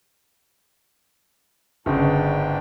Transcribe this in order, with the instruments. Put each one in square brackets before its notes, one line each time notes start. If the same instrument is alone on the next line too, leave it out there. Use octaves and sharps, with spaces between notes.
[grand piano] G1 C#3 [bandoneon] G#2 D4 G5